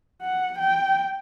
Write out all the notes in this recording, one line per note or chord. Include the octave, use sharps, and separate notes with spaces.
F#5
G5